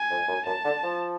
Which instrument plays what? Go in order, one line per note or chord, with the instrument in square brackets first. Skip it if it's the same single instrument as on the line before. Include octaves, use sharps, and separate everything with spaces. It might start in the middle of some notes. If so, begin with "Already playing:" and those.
Already playing: [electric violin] G#5
[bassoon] F2
F#2
[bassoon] F#2 [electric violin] A5
[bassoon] D3
F3